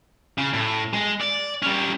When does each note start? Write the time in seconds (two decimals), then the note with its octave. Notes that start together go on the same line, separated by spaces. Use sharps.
0.38 C#3
0.53 A2
0.93 G#3
1.21 D5
1.63 G3 C#4